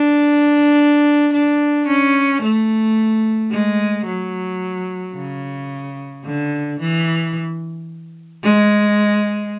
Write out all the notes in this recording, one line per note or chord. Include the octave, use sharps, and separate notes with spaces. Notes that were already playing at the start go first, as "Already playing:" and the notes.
Already playing: D4
D4
C#4
A3
G#3
F#3
C#3
D3
E3
G#3